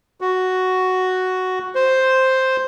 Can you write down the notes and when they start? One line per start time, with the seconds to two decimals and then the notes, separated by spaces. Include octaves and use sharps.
0.21 F#4
1.75 C5